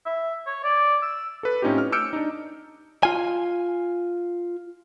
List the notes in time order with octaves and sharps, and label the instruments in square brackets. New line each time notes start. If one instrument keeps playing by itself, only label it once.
[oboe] E5
C#5
D5
E6
[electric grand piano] A4 B4
A2 C4 C#4 D#4 F4 G4
F6
D6 E6 F6 G6 C#7 D7
D4 D#4
[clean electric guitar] F4 G#5